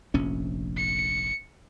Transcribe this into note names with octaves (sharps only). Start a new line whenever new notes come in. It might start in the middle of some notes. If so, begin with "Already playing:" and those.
F1 A#1 C#4
C#7